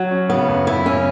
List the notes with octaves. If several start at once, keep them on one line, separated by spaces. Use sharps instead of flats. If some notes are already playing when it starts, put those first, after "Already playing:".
Already playing: F#3
C#4
C#3 B3
F#2
F#2 E4
C#3 C#4